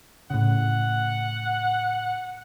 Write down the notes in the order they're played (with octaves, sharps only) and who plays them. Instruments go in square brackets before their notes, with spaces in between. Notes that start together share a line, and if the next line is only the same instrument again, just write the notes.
[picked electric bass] A2 C#3 [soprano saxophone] F#5